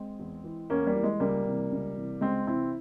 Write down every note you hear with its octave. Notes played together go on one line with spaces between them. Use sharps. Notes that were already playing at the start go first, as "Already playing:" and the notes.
Already playing: G#3 C4
E2
E3
E2 A#3 C#4
G3 A#3
E3
G#3
C#2 G3 A#3
C3 E3
C#2
C3 E3
C#2 G#3 C4
C3 E3 C4 E4